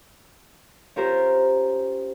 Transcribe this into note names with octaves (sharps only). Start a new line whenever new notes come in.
C#4 F4 G4 A#4 C5